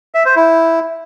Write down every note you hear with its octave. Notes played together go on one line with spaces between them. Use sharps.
E5
C5
E4